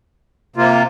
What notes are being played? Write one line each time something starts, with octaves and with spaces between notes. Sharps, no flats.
C3 A#3 F4